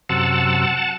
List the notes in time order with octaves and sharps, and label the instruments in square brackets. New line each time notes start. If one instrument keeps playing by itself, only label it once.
[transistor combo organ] F#2 C3 E6 [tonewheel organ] F#5 A5